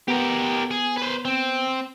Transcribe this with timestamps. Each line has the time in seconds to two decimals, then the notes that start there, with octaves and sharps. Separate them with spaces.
0.08 B3 G4 A#4
0.71 G#4
0.97 B4 C5
1.25 C4